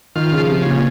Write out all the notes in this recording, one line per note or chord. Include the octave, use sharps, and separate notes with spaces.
D#3 F4
C#3
F3
C3
A#2 C#3